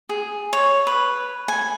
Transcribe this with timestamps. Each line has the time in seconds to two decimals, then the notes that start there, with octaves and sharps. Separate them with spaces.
0.09 G#4
0.53 C#5
0.87 B4
1.48 G#5